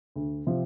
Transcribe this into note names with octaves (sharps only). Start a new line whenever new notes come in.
D2
C3 F3 C4